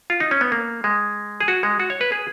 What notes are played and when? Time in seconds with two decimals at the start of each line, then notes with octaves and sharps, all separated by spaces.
0.10 F4
0.20 D#4
0.31 C#4
0.41 B3
0.52 A#3
0.84 G#3
1.41 G#4
1.48 F#4
1.63 G#3
1.79 F#4
1.90 C#5
2.01 B4
2.12 G#4